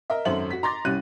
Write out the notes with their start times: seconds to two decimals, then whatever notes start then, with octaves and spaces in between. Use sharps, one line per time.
0.10 A#4 D#5 E5
0.25 G#1 F#2 A4 C5 E5 F#7
0.51 F#4 B6
0.63 A#5 C6 D6 A6 A#6
0.85 C2 G3 C#4 F#6 D#7